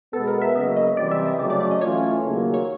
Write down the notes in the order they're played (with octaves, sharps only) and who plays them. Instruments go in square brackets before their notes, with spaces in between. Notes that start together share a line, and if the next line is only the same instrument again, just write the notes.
[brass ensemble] B2 G#3 B3 [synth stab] A4
[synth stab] A#4
E5
[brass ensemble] C#3 F#3 A#3 [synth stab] D#5
[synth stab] D#5
[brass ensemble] C3 E3 G3 C4 [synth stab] D5
[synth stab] E5
D#5
[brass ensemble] C#3 F#3 A3 C#4 [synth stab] D5
[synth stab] D5
D5
D#5
[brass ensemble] E3 A3 C#4 F4 [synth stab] C#5
[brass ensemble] D#2 C#3 F#3 A#3
[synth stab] C#5